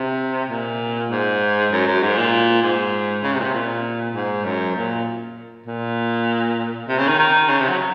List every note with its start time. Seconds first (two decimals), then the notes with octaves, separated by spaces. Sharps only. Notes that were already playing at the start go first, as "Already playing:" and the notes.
Already playing: C3
0.50 A#2
1.10 G#2
1.72 F#2
1.87 F#2
2.02 G#2
2.17 A#2
2.62 G#2
3.23 C#3
3.34 C3
3.40 A#2
3.44 C3
3.54 A#2
4.15 G#2
4.45 F#2
4.76 A#2
5.66 A#2
6.88 C3
6.98 C#3
7.08 D#3
7.19 D#3
7.49 C#3
7.60 C3
7.69 F#3